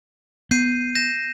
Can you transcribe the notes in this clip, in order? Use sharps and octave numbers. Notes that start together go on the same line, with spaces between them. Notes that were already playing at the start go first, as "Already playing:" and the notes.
B3 G6 C7 D#7
G6 A#6 E7